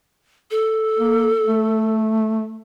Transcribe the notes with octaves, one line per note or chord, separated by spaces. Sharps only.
A4
A#3
A3